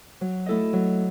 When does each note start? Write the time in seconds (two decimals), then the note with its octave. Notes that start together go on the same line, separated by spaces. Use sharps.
0.21 F#3
0.46 A3 E4 A4 D#5
0.73 F#3